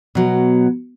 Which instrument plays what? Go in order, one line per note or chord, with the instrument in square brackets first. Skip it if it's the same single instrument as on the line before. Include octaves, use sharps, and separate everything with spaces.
[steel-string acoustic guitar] B2 F#3